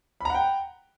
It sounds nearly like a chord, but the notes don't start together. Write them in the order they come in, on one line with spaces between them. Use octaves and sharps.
B5 A#5 F#5 G5